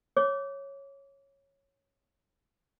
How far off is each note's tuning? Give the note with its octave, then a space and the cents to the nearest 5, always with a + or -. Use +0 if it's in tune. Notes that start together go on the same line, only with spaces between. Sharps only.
C#5 -5 D6 -25